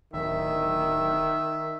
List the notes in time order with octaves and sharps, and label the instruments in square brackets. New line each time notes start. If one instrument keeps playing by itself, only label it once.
[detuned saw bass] D1 [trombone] D#3 [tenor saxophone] E5